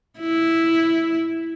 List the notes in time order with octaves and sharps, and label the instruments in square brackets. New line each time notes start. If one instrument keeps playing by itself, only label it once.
[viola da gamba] E4